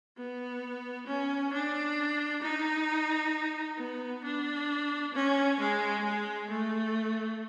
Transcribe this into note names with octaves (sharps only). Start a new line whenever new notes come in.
B3
C#4
D4
D#4
B3
D4
C#4
G#3
G#3
A3